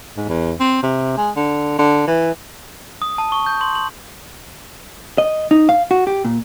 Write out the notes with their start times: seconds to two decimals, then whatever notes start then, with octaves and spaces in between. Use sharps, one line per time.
0.17 G#2
0.29 E2
0.60 C4
0.83 C3
1.17 G#3
1.36 D3
1.78 D3
2.07 E3
3.02 D#6
3.18 A5
3.32 C#6
3.46 G6
3.61 C6
3.75 F#7
5.18 D#5
5.51 D#4
5.69 F5
5.91 F#4
6.07 G4
6.25 A#2